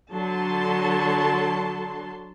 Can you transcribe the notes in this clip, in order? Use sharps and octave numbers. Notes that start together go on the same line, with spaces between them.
D3 F#3 A5 C6